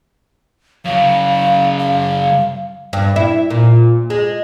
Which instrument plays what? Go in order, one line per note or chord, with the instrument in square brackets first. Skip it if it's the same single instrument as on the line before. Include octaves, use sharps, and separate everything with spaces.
[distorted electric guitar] F#2 C#3 [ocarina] F5
[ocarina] F5
[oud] G2
E4
A#2
G#3